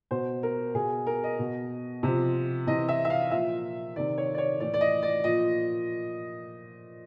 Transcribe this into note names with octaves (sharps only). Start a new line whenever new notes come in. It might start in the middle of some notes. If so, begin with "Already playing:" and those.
B2 C5
A#4
B2 G#4
A#4
D#5
B2
C3 F3
C3 E3 D#5
E5
E5
F5
A#2 F3 E5
C3 D#3 D5
C#5
D5
C#5
A2 E3 D5
D5
D#5
D5
A#2 F3 D#5